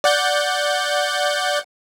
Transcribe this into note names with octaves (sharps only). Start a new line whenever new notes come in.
D5 F#5 G6